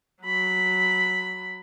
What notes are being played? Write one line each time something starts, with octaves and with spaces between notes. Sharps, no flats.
F#3 B5